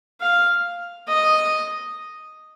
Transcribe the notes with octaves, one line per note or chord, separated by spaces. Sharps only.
F5
D#5